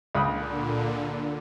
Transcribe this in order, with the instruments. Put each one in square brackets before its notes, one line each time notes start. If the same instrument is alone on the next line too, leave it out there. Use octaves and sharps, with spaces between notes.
[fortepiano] C#2 B5 D#6 [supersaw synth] A#2 D3